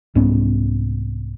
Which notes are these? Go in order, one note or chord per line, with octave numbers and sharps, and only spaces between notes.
C2 G#2 B3 C#4